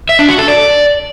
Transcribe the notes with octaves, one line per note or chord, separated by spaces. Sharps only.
E5
D4
F#4
A4
D5